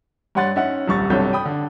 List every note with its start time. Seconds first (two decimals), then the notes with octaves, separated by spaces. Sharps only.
0.35 G2 C#5 F#5 C6 A6
0.56 C#4 D#4 E5 F#5
0.88 D#1 C2 C#6 A6
1.10 B1 G2 C3 A4 C#5 G6
1.33 G5 B5 D#6
1.45 D3